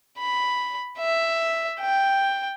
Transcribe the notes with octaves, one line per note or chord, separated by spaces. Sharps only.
B5
E5
G5